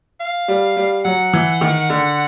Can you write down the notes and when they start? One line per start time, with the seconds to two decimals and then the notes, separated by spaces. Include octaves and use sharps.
0.20 F5
0.48 G3
0.77 G3
1.05 F#3 F#5
1.33 E3
1.61 D#3
1.90 D3